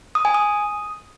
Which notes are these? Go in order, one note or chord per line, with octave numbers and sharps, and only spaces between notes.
D#6
G#5
D#6